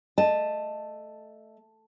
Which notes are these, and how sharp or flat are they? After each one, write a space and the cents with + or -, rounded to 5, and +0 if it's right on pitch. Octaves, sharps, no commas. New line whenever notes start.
A3 +0 D#5 -20 A5 +0